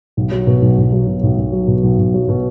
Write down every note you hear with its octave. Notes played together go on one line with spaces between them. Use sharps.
B1
F#3
B2
B1
B1
F#3
B2
B1
B1
F#3
B2
B1
B1
F#3
B2